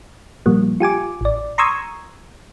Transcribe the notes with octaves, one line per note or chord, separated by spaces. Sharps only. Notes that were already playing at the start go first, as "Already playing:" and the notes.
A#2 F3 G3 A#3
F4 G4 G#5 D6
A1 D5
A#5 C6 C#6 D#6 E6 G#6